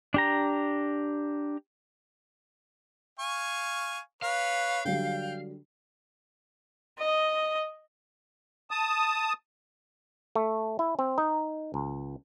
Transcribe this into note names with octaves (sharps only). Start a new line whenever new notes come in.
D4 G4 A#5
F5 G#5 C#6
B4 C#5 F5
D3 F#3 G3 G5
D#5
A5 D#6
A3
E4
C4
D#4
C#2